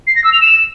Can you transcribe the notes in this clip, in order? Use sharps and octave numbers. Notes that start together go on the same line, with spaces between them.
C7
A#6
E6
F7
E7